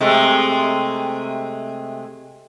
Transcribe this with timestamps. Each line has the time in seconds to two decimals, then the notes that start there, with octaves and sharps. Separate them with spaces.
0.01 C3 G#3 A3